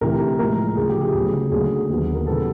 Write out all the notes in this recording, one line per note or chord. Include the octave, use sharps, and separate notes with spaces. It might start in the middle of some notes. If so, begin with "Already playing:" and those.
D2 C3 E3 A#4
A2 F3 G#3 A#4
D2 C#3 F3 G#4
G4
G#4
D2 C#3 F#3 B3
D2 D3 F#3 A#3 G#4
D#2 D3 F#3 B3
A#4
C#3 E3 G3 B3 A4